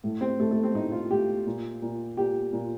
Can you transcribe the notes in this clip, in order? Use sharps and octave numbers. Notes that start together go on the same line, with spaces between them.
A2
C4
A2 A3
A3
C4
A2 D#4
F4
A2 G4
A#2
A#2
A#2 G4
A#2